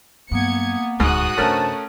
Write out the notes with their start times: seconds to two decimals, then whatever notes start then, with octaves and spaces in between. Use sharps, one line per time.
0.31 G2 F#3 A#3 B3 G#6 C#7
1.00 D#1 D2 G#2 F#4 D#6 F#6
1.38 F#2 C3 A3 C#4 D4 A#4 C5 A5